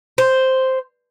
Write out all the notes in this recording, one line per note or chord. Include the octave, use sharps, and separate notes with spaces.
C5